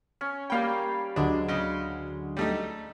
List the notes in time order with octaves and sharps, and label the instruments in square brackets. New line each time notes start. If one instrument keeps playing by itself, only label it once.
[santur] C#4
[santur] G3 F5 B5 [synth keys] A#3 G5
[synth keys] D2 D3 F#3 [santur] G#3 [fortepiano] D4
[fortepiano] C#3 D#5
G3 A3 D#4